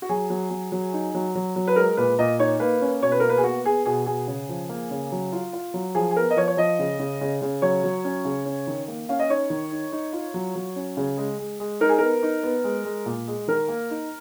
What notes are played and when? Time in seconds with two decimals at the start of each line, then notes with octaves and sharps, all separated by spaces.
0.02 F#4
0.09 F#3 G#4
0.30 F#3
0.51 F#3
0.72 F#3
0.93 D#4
1.15 F#3
1.35 F#3
1.56 F#3
1.68 B4
1.76 G#3 A#4
1.97 A#2 B4
2.19 A#2 D#5
2.39 D#4 C#5
2.60 A#3 B4
2.81 C#4
3.02 B2 C#5
3.12 B4
3.20 A#3 A#4
3.29 B4
3.38 G#4
3.44 B3 F#4
3.65 B3 G#4
3.86 B2 G#4
4.06 B2 G#4
4.27 C#3
4.49 F3
4.69 A#3
4.91 C#3
5.12 F#3
5.32 F4
5.53 F4
5.74 F#3
5.95 F3 G#4
6.11 G#4
6.16 B3 A#4
6.30 D#5
6.36 F3 C#5
6.47 C#5
6.57 F3 D#5
6.79 C#3
6.99 C#3
7.21 C#3
7.42 C#3
7.62 F#3 C#5
7.84 F#3
8.04 C#4
8.25 C#3
8.45 C#4
8.67 D#3
8.88 A#3
9.09 C#4 F5
9.19 D#5
9.29 D#4 C#5
9.50 D#3
9.71 D#4
9.92 D#4
10.13 F4
10.34 F#3
10.56 F#3
10.76 C#4
10.97 C#3
11.18 G#3
11.39 G#3
11.60 G#3
11.81 D#4 A#4
11.89 G#4
11.98 B3 A#4
12.23 D#4
12.43 B3
12.64 G#3
12.85 G#3
13.06 A#2
13.28 G#3
13.48 D#3 A#4
13.69 A#3
13.90 D#4